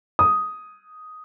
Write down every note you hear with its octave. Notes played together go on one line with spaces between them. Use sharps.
D#6